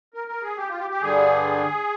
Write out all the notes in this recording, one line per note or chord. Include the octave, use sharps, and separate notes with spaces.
A#4
A#4
G#4
G4
F4
G4
G4
G2 D3 G3 G#4